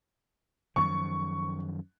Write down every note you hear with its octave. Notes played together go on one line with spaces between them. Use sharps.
F#2 D#3 F3 C#6